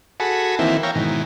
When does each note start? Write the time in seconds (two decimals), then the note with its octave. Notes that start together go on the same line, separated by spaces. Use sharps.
0.20 F#4 G#4 A4 B5
0.59 D#3 E3 A#3 C4 E4
0.83 C#5 E5 F5 G5 A#5
0.95 G#2 B2 D#3 E3